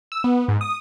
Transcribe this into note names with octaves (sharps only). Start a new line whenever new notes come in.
E6
B3
G#2
D#6